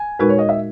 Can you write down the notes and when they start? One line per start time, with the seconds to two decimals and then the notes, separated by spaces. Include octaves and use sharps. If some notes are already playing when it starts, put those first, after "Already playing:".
Already playing: G#5
0.19 A#2 G#3 D#4 F#4 A#4 B4
0.29 C#5
0.39 D#5
0.49 E5